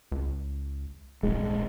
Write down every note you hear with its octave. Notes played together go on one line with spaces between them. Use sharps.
C#2
D#1 A#1 G#2 G#3